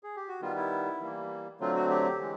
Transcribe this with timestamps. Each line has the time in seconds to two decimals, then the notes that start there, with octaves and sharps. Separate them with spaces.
0.03 G#4
0.16 G4
0.28 F#4
0.41 D#3 G3 B3 F4
0.56 E4
1.00 E3 G3 A#3
1.60 D3 F#3 A3 C4 F4
1.76 F#4
1.90 G4
2.20 E3 G#3